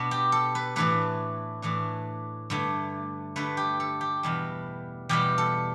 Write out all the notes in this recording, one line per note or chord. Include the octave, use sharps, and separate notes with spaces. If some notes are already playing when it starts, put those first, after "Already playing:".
Already playing: B2 B3 D4
G4
A4
B4
A2 E3 A3 D4 B4
A2 E3 A3 D4
G2 D3 A3
G2 D3 A3 B4
G4
A4
G4
E2 B2 G3
E2 B2 G3 G4
A4